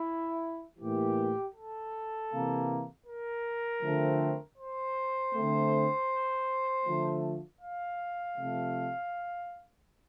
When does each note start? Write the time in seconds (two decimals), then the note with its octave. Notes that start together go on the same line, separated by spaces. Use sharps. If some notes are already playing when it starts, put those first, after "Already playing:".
Already playing: E4
0.79 A2 E3 A#3 G4
1.55 A4
2.30 C3 E3 A#3
3.07 A#4
3.82 D3 F3 A3 C4
4.57 C5
5.33 D3 A3 C4
6.85 D3 F3 A3
7.61 F5
8.37 C3 F3 A3